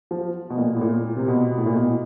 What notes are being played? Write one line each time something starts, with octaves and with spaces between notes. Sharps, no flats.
F3
B2
A#2
A2
A#2
C3
B2
A2
A#2
B2